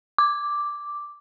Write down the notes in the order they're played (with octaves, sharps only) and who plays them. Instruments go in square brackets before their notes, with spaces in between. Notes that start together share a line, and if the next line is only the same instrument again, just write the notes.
[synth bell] D6